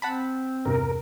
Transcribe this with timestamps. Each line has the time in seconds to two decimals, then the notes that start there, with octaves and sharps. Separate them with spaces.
0.02 C4 F#5 A5 B5
0.65 E2 G2 C3 A#4